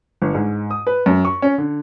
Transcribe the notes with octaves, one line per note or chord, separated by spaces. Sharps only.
G1
G#2
D#6
B4
F#2
C#6
C#4
D3